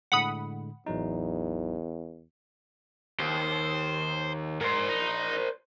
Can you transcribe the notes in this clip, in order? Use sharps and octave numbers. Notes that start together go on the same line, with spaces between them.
A2 D3 G#3 F#5 B5 D#6
A1 E2 F#3 D#4
D#2 C5
G#2 A#4 C5
D#4